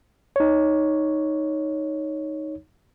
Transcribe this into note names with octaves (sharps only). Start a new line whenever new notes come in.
D#4 C#5